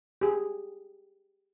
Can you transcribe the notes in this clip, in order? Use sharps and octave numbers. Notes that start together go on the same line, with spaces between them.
G4 G#4